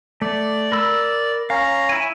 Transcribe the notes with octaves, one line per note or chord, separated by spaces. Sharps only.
A3 D5
A#4 B5 E6
C#4 F5 A#5
E4 G#5